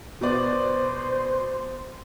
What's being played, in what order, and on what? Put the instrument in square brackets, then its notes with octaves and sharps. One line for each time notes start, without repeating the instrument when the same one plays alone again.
[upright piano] B2 B3 D5 [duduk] C5